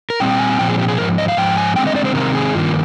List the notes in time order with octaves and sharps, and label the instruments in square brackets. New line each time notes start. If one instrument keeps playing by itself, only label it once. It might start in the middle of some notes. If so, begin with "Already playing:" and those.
[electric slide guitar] A#4
A#2 G3 C4 G5
G#5
A#2 F3 C4 G5
G#4
G4
G#4
G#2 F3 A#4
D#5
F5
G#2 F3 G5
G#5
D3 G#3 C4 G5
D#5
D5
C5
C3 D#3 G#3 C4 A#4
G#4
G2 D#3 A#3 F4